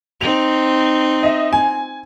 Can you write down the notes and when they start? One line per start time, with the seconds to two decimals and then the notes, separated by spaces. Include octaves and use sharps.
0.21 C4 D#4 F7
1.23 D#5 E5
1.53 G#5